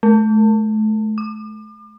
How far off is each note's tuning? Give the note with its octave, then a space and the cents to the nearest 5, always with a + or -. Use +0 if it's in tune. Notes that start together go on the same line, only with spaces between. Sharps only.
A3 -35
D6 +40